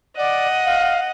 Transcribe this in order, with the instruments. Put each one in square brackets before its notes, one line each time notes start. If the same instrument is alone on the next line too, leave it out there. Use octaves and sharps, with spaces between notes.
[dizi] D5 [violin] D#5 F#5
[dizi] F5